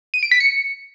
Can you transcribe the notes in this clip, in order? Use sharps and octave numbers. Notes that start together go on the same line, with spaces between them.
D#7
D7
B6
C#7